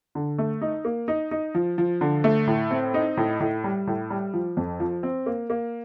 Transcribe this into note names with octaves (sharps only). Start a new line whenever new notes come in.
D3
A3
D#4
A#3
D#4
D#4
F3
F3
D3
A3
A2
C4
D#4
A2
A2
G3
A2
G3
F3
F2
F3
C4
A#3
A#3